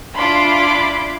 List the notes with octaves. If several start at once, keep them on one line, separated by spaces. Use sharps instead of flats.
D4 E4 F4 B5 C6 D6